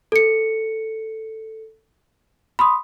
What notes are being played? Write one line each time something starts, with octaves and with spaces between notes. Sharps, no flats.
A4 C#7
B5 C6 D#6